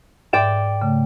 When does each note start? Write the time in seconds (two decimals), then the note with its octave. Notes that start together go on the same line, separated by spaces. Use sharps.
0.33 G#2 D5 G5 E7
0.82 C#3 A3